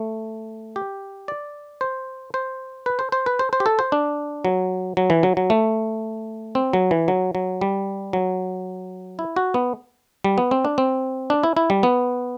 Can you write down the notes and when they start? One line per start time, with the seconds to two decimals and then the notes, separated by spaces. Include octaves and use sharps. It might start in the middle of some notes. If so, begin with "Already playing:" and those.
Already playing: A3
0.76 G4
1.28 D5
1.81 C5
2.34 C5
2.86 B4
2.99 C5
3.12 C5
3.26 B4
3.39 C5
3.53 C5
3.60 G4
3.66 A4
3.79 C5
3.92 D4
4.45 F#3
4.97 F#3
5.10 E3
5.23 F#3
5.37 F#3
5.50 A3
6.55 C4
6.73 F#3
6.91 E3
7.08 F#3
7.35 F#3
7.61 G3
8.13 F#3
9.19 E4
9.36 F#4
9.54 B3
10.24 G3
10.38 B3
10.51 C4
10.65 D4
10.78 C4
11.30 D4
11.43 E4
11.57 E4
11.70 G3
11.83 B3